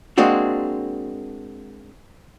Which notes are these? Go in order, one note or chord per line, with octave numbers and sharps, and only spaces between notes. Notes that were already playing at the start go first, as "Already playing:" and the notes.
G#3 A#3 C4 D4 F#4